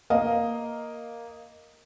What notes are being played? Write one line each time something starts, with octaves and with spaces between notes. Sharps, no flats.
A#3 D#5 F5